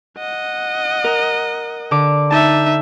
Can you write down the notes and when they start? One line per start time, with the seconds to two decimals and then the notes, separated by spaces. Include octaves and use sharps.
0.18 D#5 F#5
1.04 A#4
1.91 D3 D6
2.31 D#4 E5 A5